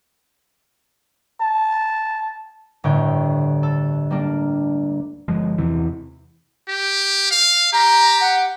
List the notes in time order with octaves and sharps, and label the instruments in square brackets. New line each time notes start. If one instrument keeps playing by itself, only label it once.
[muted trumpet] A5
[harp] G1 D2 A2 C#5 G5
A4
G3 A#3 D4
[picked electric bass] G1 F3 G#3
E2 C3 E3
[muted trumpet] G4
F5
[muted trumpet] G4 [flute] A#5
[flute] F#5